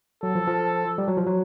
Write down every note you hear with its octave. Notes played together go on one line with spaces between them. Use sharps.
F#3 A4
F3
F3
G3
F#3
F3
F#3